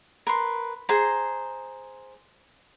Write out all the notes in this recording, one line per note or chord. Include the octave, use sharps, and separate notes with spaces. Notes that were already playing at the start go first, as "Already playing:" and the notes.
A#4 B4 C6
G#4 C5 A#5